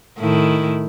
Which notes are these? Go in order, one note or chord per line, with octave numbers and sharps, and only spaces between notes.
A2 D#3 E4